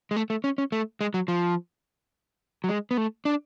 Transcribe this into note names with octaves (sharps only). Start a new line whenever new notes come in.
G#3
A3
A3
C#4
C#4
A3
G#3
F#3
F3
F#3
G#3
B3
A3
D4